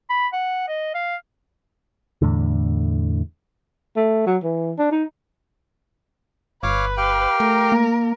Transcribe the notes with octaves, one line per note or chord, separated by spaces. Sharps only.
B5
F#5
D#5
F5
E2 A2 D3
A3
F#3
E3
D4
D#4
G1 B4 C#5 F5 D6
G4 F5 G5
A3 A#4
A#3